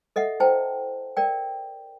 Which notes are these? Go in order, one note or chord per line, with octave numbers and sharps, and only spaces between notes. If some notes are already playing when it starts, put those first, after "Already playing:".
A4 D#5 E5 F#5
E4 C5 G5 A5
A#4 D5 G5